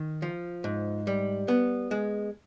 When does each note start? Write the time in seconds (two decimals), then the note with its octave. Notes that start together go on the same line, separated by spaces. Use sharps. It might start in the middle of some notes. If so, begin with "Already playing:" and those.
Already playing: D#3
0.22 F3
0.64 G#2
1.07 G3
1.48 B3
1.91 G#3